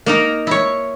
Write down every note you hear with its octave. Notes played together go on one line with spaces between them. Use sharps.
A#3 D#4 A#4
E4 C#5